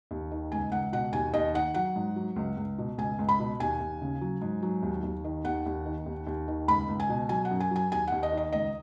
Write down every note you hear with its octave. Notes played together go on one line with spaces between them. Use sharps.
D#2
D#3
C#2 G#5
C#2 F#5
B2 F#5
D#2 G#5
D#2 D#5
D#3 F#5
F#3 F#5
G#2
F#3
C#2
C#2
B2
C#2 G#5
C#2
B5
B2
D#2 G#5
D#2
C#3
F#3
G#2
F#3
D#2
D#2
D#3
D#2 F#5
D#2
D#3
D#2
D#2
D#3
C#2 B5
C#2
G#5
B2
F#3 G#5
F#5
F#2
G#5
F#3 G#5
D#2 G#5
D#2 F#5
D#5
D#3
D#5
C#2 D#5